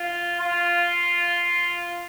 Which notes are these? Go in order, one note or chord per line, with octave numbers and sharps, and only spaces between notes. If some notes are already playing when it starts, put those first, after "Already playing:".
Already playing: F4
F4